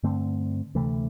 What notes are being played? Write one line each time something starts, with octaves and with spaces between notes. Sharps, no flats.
G2 D3 A3 C4
D2 C3 E3 A3